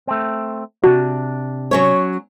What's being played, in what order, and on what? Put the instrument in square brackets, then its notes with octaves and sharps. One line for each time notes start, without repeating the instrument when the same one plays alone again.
[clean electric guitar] A3 C4
[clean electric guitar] C3 D4 [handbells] F#4
[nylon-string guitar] F#3 C#4 C#5